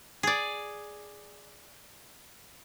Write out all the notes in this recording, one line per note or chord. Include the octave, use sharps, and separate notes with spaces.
G#4 D5